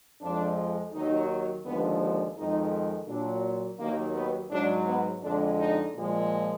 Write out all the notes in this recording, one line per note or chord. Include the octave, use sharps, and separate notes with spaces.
F2 F3 G#3 D4
D#2 D#3 F#3 D#4
D#2 D3 F3 G#3 B3
D4
F2 D#3 G#3 D#4
A#2 F#3 D4
D#2 D#3 F#3 A#3
B3
G#2 F#3 D4
B3
F2 D3 G#3 D4
D#4
A#2 F3 G#3